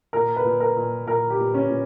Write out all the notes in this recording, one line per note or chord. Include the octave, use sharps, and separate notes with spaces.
A#2 A#4
B4
A#2
A#4
A#2
A#2 A#4
G4
A#2
C#4
A#2